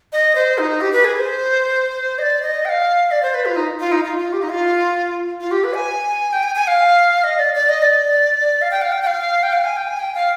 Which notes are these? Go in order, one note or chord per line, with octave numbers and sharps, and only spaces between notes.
D#5
C5
D#4
G4
B4
G#4
C5
D#5
D5
D#5
G5
F5
D5
C5
B4
F4
D#4
F4
D#4
F4
F4
G4
D#4
F4
F4
G4
B4
G#5
G5
G#5
G#5
F5
D#5
D5
D5
D#5
D5
F5
G5
F5
G5
G5
F5
G5
F5
G#5
G5
G#5
G5
F5